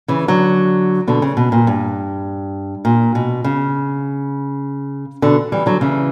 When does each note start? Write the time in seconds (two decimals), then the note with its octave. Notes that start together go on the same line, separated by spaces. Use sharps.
0.08 C#3 E3
0.28 D3 F#3
1.08 B2 D3
1.22 C#3
1.37 B2
1.52 A#2
1.67 G2
2.85 A#2
3.15 B2
3.44 C#3
5.22 B2 D3
5.52 E3 G3
5.66 D3 F#3
5.81 C#3 E3